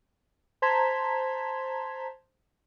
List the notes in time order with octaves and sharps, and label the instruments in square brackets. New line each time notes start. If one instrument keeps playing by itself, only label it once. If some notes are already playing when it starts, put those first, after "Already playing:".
[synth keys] C5 A5 A#5 C6 G#6 B6